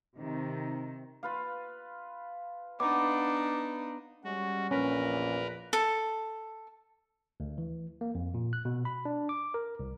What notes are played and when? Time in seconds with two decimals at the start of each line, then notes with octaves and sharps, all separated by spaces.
0.18 C3 D#3
1.23 F4 B4 F5
2.80 B3 D4 D#4 D6
4.24 G3 G#3 C#4 F#4
4.71 A#1 E2 A#2 C#4 A#4 B4
5.73 A4
7.40 D2
7.58 E3
8.01 A#3
8.15 F2
8.34 A#2
8.53 F#6
8.65 B2
8.85 B5
9.05 D4
9.29 D6
9.54 A#4
9.79 C2